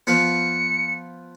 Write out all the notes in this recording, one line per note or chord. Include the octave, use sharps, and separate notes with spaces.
F3 B3 C#7